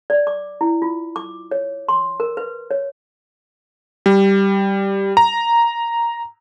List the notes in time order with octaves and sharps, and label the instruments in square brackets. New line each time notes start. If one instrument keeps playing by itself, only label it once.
[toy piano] D5
D6
E4
F4
D6
C#5
C6
A#4
B4
C#5
[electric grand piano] G3
A#5